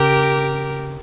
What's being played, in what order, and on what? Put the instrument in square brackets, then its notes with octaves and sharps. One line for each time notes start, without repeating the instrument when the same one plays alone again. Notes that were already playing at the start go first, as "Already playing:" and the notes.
Already playing: [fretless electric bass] C#3 [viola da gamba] G4 A#4